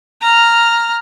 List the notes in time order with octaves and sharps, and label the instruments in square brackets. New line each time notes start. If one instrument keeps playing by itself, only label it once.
[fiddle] A#5 F6